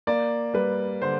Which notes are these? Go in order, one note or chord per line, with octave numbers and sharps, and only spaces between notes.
A#3 D5
G3 B4
D3 C5